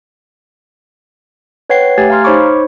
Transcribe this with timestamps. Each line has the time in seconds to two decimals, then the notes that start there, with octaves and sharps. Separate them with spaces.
1.70 B4 C#5 F#5 G5 C7
1.98 A3 G4 G#5 G#6 A6
2.10 F5 A#5 C6 F6
2.24 D#4 C5 C#5 B5 C#6 D6